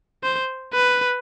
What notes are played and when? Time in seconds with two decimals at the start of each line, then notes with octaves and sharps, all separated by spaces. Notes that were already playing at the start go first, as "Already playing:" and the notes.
0.23 C5
0.74 B4